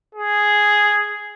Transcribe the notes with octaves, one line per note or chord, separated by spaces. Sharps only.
G#4